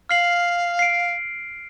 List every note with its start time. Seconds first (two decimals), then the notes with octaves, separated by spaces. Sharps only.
0.09 F5 F6 C7 F#7
0.79 C7 D7